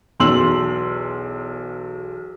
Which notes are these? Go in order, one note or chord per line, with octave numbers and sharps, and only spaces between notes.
B1 E2 C6 E6 F#7